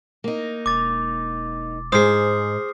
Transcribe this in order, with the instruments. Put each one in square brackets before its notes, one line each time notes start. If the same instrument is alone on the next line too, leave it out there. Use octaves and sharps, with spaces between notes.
[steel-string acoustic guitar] A#3 D#4
[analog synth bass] E1 [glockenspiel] D6 A6
[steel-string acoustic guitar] G#2 [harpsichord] G#4 C5 [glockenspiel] D#6 F6 C7